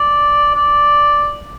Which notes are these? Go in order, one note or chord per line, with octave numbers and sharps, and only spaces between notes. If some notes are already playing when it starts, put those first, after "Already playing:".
Already playing: D5
D5